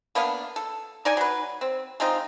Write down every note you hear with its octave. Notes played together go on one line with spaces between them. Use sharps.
A#3 B3 D4 F5
A4
D#4 D5 G#5
F#3 B4
C4
G#3 C4 D#4 F4